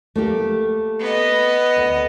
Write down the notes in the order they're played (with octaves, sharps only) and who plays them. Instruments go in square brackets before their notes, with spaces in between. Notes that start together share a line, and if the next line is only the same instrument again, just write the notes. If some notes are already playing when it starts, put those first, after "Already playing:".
[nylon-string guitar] A3 A#3 G4
[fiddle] B3 D#5
[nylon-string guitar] D2